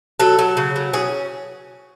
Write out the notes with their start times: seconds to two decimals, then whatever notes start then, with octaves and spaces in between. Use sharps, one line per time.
0.20 F#3 A4
0.39 F#3
0.57 C#3
0.76 F#3
0.93 C#4 G#4